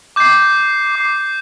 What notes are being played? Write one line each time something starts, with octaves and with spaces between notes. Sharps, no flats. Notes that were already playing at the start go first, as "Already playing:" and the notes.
D6 G6 C7
D6 G6 C7